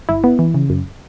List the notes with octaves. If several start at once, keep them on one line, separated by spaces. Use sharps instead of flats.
G1 E4
B3
E3
C#3
F#2